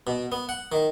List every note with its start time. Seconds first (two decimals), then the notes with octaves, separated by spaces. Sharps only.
0.07 B2
0.32 B3
0.49 F#5
0.72 D#3